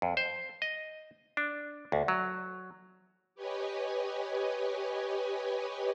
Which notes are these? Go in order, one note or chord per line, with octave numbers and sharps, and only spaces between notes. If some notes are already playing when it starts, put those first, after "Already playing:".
F2
C5
D#5
D4
D2
F#3
G4 B4 C#5 D#5 G#5